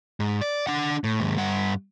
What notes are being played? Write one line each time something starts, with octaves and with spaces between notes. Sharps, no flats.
G#2
D5
D4 F#5
A2
D#2 G#2
G2 F#5